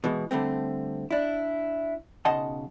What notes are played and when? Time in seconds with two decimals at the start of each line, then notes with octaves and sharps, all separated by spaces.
0.04 B2 E3 G#3
0.31 D3 G3 A3 C4
1.11 D4 E4
2.25 B1 C#3 D#5 F#5 A5 C6